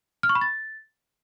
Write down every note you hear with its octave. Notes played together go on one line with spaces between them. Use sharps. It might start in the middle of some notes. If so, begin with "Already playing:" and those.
F6
C#6
B5
A6